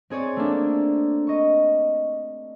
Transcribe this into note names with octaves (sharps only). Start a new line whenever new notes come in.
C4 G#4 C#5 D5
A3 A#3 D4
D#5 C#6